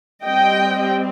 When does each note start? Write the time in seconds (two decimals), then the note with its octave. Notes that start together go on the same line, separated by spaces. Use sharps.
0.23 G3 C4 D#5 G5